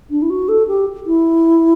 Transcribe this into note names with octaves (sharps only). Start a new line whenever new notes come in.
D4
E4
F#4
A4
G4
E4